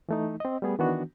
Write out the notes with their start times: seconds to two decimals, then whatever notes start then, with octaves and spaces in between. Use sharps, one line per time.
0.09 E3 A3 D#4
0.40 C4 D#5
0.62 G3 A3 B3 G#4
0.79 D#3 E3 B3 D4 F#4